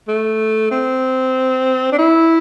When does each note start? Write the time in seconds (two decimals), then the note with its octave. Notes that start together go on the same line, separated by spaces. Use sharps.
0.08 A3
0.71 C4
1.92 D4
1.99 E4